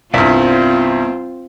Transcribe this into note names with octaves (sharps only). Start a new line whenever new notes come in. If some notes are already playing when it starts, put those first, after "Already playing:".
C2 G2 B3 C4 F4 D5 E5